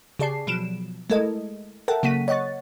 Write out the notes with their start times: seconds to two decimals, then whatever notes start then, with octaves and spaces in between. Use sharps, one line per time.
0.19 C#3 G4 G#4 D5 A5 C7
0.47 B2 F3 F#3 D7 E7
1.10 G#3 A3 E4 A4 A#4 D#5
1.88 A4 A#4 E5 F#5 G5 A5
2.03 C#3 F#3 A#3 F#5 B6 D#7
2.28 C#5 D#5 F#5 C#6 A6